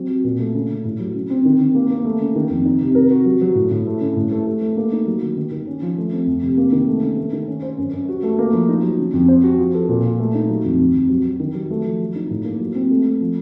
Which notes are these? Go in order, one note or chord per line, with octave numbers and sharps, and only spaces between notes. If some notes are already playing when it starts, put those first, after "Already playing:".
Already playing: F#3 C4
F#4
A#2
A3
C#3
C#3
A2
F#3
C#3
C4
D#3
D#3
A#3
A#3
A3
C#3
D#3
F2
D#4
C3
A#4
F#4
F#3
F#3
A2
A2
A3
C#3
A2
A3
A3
A3
A#3
D#4
F#3
D#3
D#3
D#3
C#4
F3
A3
C4
F2
C3
A#3
D#3
A3
C#3
A3
D#3
C#4
C5
F#2
F#2
F#4
A3
A#3
F3
D#4
F#3
C#3
F2
C5
F#4
F3
A4
A#2
F4
A3
D#4
F#3
F2
F2
F2
F#3
F#3
D#3
F#3
A3
F3
F#3
D#4
A2
A#3
F#3
C4
A3
A3
F3